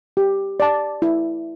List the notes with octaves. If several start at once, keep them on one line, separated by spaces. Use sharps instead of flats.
G4
D5 A5
E4